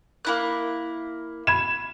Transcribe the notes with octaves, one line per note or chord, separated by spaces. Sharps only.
A#3 E4 F#6
B5 G#6 E7